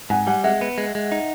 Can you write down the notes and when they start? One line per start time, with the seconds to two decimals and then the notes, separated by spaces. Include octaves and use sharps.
0.10 G#2 F#5 G#5
0.27 G3 F#5 G#5
0.44 G#3 E5 F#5
0.61 B3
0.78 G#3
0.95 G#3
1.12 D#4